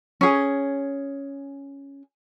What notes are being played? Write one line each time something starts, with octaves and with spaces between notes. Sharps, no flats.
C#4 G#4